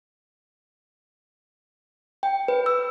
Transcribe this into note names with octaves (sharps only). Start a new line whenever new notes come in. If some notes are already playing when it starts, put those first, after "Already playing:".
G5
B4
E6